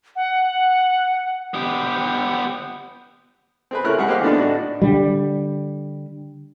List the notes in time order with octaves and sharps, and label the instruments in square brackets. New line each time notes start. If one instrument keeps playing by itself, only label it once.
[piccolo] F#5
[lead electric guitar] B3 G4
[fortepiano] C4 G#4 B4
C#3 A3 E4 A#4 C#5 F#6
C#3 G3 G#3 G#4 F#5
A#3 C4 G4 D#5 F5
D3 B3 D4 D#4
A2 D4 F#4
[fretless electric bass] D3 G3